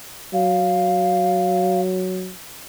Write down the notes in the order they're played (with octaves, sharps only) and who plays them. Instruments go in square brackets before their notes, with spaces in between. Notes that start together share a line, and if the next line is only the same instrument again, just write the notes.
[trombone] F#3 [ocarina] F5